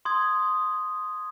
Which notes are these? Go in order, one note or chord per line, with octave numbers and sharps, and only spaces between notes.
C6 D#6 G#6